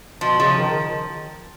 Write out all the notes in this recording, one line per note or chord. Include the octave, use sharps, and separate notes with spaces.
B2 F3
C#3 F3
D#3